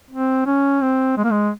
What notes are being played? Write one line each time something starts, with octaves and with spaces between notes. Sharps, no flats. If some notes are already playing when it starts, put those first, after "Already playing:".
C4
C#4
C4
G#3
A#3
G#3